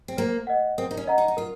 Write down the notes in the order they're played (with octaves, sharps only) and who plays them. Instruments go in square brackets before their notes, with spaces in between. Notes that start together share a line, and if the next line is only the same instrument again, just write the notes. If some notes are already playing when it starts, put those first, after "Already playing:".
[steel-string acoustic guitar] C4
[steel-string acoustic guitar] A#3 [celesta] C5
[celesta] D#5 F#5
[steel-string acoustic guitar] C4 [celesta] A#4
[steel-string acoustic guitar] D#4
C#4
[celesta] D#5 F#5 A#5
[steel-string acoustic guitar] D#4
D#4
[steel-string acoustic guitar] F4 [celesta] A#4